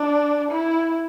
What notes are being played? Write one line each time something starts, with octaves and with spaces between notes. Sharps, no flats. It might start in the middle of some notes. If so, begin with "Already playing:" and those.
Already playing: D4
E4